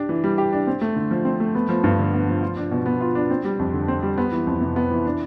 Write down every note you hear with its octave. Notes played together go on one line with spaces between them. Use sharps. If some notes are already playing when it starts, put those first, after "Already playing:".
Already playing: D4 G4
E3
G3
G4
D4
C4
A3
D3
F3
C4
A3
B3
F3
G2
D3
B3
F3
F4
D4
B2
B3
F4
D4
C4
G3
F2
D3
C4
G3
B3
E3
F2
C3
B3
E3
D4